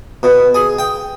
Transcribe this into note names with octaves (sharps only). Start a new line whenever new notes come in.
B2
G#4
G5